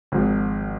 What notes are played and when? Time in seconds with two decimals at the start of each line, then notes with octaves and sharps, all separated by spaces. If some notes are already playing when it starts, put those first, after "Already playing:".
0.12 G#1 G#2 F3